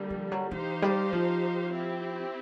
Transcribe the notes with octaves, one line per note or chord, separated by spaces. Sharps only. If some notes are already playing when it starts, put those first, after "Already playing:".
Already playing: D3 G3 A#3
F3
F#3
E3 D#4 G4 C5 F5
G3
F3
C4 E4 G4